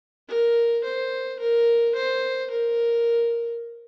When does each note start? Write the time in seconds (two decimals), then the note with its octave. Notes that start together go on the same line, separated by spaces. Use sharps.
0.28 A#4
0.84 C5
1.40 A#4
1.95 C5
2.50 A#4